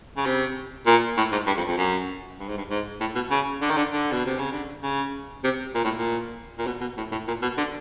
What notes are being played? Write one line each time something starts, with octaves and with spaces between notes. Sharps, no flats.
C#3
C3
A#2
A2
G#2
G2
F2
F2
F#2
G2
G#2
G2
G#2
A2
B2
C#3
D3
D#3
D3
D3
B2
C3
C#3
D3
C#3
C3
A#2
A2
A#2
A#2
B2
B2
A2
A2
A#2
B2
D3